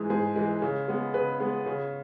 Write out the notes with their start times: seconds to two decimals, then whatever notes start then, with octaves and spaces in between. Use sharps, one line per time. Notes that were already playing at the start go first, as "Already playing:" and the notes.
Already playing: G#2 E3 G#3 G#4
0.10 G#2 G#4
0.36 E3 G#3
0.62 C#3
0.88 G#3 B3
1.14 C#3 B4
1.40 G#3 B3
1.66 C#3